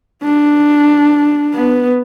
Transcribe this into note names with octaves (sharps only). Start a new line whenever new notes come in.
D4
B3